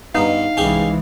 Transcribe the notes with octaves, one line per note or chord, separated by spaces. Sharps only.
G2 B3 D#4 F5
C2 E3 G#3 C#4 G4 G#4